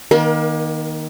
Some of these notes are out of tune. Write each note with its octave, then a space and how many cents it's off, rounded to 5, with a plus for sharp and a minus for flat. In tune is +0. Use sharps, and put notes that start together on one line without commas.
D#3 +0 A#3 +25 A#4 +45